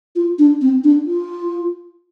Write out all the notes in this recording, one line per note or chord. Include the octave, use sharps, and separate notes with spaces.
F4
D4
C4
D4
F4